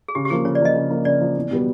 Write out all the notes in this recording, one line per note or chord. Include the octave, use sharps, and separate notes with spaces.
G#4
C#3 G4
G4
F3 A#3 G#4
C#3 C#5
D5
F3 A#3 D#5
C#3
F3 A#3
C#3 D5
F3 A#3
E2
B2 G3 B3